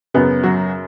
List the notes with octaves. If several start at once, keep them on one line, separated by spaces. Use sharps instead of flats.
F#2 C#3 F#3 B3
F#3 F#4